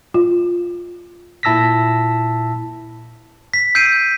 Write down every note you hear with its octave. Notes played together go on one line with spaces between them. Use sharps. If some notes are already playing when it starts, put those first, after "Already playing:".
F4
A#2 E4 A5 E6 A#6 B6
B6
E6 G6 C7 D7 D#7